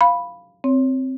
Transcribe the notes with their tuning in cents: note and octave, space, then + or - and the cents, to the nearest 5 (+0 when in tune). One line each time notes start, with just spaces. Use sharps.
F5 +0 B5 +0
C4 +0 C#5 +10